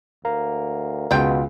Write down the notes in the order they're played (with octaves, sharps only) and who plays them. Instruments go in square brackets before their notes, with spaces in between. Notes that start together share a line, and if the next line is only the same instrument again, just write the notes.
[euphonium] D2 [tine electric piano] A#4 F5 A#5
[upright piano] C#2 [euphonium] B2 [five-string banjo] F4 G5